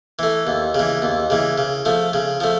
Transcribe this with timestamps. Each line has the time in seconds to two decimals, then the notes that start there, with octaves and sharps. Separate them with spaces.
0.19 E3 A3
0.47 D#2
0.75 C#3 E3
1.02 D#2
1.30 C#3 E3
1.58 C#3
1.85 F3 A3
2.13 C#3
2.40 F3 A3